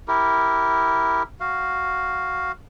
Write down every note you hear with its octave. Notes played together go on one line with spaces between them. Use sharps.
E4 G4 A#4
F#4 F5